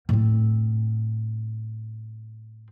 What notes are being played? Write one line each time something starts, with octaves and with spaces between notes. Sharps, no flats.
A2 C4